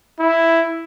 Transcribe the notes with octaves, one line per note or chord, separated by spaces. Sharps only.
E4